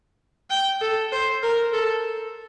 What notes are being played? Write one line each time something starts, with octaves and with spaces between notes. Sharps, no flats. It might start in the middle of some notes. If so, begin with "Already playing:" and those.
G5
A4
C5
A#4
A4